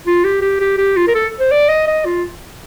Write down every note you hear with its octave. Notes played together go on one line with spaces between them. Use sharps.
F4
G4
G4
G4
G4
F4
A#4
A4
C5
D5
D#5
D#5
F4